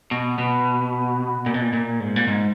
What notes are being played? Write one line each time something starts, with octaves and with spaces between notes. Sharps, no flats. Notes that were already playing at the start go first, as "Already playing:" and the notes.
B2
B2
A#2
B2
A#2
A#2
G#2
A#2
G#2